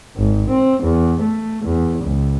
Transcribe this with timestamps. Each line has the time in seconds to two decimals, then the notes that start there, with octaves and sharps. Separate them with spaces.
0.17 G#1
0.49 C4
0.83 E2
1.21 A3
1.65 E2
2.04 C#2